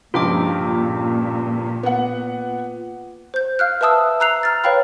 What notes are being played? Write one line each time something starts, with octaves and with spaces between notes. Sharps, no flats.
C#2 G2 A#2 F3 F4 G5 D6
B3 F#5
C5 G6
F5 F6 F#6
B4 E5 A5 D#6 E6
A#5 E6 F#6 C7 F7
A#5 F6 A6
B4 C#5 F5 G5 B5